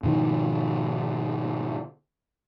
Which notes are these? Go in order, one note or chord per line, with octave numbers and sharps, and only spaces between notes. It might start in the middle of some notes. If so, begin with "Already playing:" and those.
G#2 B2 D#3 F3